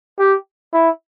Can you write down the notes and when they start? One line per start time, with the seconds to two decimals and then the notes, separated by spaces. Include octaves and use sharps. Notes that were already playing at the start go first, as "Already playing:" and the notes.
0.19 G4
0.73 E4